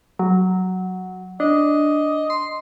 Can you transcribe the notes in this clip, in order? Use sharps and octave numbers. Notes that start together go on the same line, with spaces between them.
F#3
D4 D#5
C6